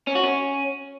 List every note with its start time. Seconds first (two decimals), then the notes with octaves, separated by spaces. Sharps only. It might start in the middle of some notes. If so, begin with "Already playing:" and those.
0.07 C#4
0.15 F#4
0.24 C#4